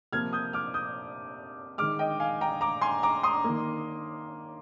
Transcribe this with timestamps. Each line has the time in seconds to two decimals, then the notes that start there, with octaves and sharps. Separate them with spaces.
0.12 C3 F3 A#3 F6 G#6
0.33 D#6 G6
0.53 D6 F6
0.74 D#6 G6
1.78 D#3 G#3 D6 F6
1.99 D#5 G5
2.20 F5 G#5
2.41 G5 A#5
2.61 A#5 D6
2.82 G#5 C6
3.03 A#5 D6
3.23 C6 D#6
3.44 D#3 A#3